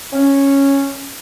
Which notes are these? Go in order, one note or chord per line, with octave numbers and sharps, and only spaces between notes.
C#4